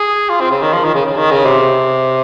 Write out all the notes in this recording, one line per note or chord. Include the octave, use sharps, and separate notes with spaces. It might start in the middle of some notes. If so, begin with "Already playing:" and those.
Already playing: G#4
F4
C4
C#3
D#3
F3
D#3
C#3
C#3
D#3
C#3
C3